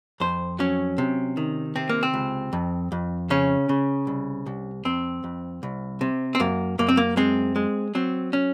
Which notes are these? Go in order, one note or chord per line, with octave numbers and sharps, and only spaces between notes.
F2 C5
F#3 C#4
C3
D#3
C3 C4
A#3
C4
C#2
F2
F2
C#3 C#4
C#3
C2
C2
F2 C4
F2
C2
C3
C4
F#2 A#3
F#2 A#3
C4
A#3
G#3 C4
G#3
F#3 C4
C#4